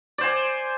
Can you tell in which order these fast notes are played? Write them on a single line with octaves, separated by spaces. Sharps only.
D5 C5 G#5